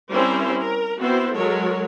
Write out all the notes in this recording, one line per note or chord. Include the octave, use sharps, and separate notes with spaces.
G3 C4 C#4 E4 A#4 C5
A#4
B3 C4 E4 F#4 C5
F#3 G#3 A4 A#4 C#5